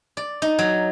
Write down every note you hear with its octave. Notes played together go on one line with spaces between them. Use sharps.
D5
D#4
F#3